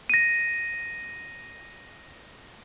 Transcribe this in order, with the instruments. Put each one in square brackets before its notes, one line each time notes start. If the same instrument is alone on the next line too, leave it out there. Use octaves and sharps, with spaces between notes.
[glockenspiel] A#6 D#7